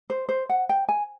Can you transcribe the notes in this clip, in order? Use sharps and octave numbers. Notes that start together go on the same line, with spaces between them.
C5
C5
F#5
G5
G#5